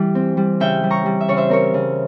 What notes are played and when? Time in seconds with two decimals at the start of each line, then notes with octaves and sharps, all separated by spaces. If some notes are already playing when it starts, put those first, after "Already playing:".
Already playing: E3 G3 E4 G5
0.15 C4
0.37 G3
0.60 C#3 E5 G5
0.83 G3
0.90 A#5 C#6
1.06 G3
1.20 E5
1.28 C#3 C#5
1.37 C5 E5
1.49 C4 A#4 C#5
1.74 C#3